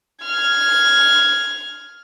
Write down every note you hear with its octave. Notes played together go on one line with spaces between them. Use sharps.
F6 G#6